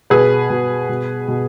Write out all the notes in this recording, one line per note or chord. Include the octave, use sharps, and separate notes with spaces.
B2 G#4 B4
B2
B2
B2